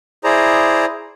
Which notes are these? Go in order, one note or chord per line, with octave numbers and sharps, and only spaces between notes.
E4 G#4 C5 D5 A#5